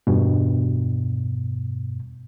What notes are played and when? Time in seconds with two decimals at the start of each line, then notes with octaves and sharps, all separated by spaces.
0.07 E2 G2 B2